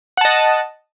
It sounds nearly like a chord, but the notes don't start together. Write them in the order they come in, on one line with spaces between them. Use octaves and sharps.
F#5 A5 D#5